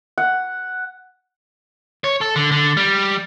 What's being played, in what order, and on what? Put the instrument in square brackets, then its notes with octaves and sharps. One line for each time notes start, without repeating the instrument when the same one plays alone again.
[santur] F#5
[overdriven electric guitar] C#5
A4
D3
D3
G3